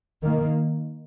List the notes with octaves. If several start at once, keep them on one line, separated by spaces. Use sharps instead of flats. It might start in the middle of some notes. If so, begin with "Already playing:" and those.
D#3 A#3